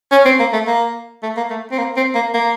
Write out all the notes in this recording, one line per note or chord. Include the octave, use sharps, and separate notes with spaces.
C#4
C4
A#3
A3
A#3
A3
A#3
A3
C4
A#3
C4
A#3
A#3